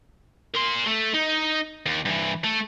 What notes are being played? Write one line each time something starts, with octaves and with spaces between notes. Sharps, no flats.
A#4 C6
A3
D#4
D#2
G2 E3
A3